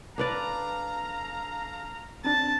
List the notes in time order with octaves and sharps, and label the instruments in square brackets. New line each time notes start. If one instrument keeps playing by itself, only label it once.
[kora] D4 B4 D5 [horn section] A4 F5 A#5
[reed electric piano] C4 D4 [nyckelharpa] A5